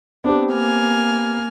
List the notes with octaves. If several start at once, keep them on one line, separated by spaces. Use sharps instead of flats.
B3 C4 D4 G4
A#3 G#5 F6